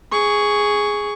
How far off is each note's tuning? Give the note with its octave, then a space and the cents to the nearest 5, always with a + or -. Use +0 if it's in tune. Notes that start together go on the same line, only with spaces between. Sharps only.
G#4 +0 C#6 +10